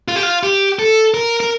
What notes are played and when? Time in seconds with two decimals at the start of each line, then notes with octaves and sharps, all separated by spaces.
0.08 F4
0.16 G4
0.23 F4
0.43 G4
0.79 A4
1.14 A#4
1.40 A#4